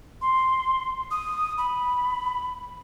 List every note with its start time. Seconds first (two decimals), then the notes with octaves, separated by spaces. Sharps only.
0.22 C6
1.11 D#6
1.58 B5